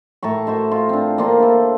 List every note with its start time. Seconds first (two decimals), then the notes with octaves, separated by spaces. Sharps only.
0.23 A2 A5 A#5 C#6
0.47 F#4 C5 E5
0.71 F4
0.89 C4 D4
1.18 A#3 C4 D4 F4
1.40 E4 A4